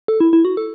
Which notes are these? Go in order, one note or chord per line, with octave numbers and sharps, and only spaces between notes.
A4
E4
E4
F#4
A4